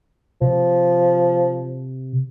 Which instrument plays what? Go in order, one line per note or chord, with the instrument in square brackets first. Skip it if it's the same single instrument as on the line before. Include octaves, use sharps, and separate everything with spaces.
[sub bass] C3 [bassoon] F3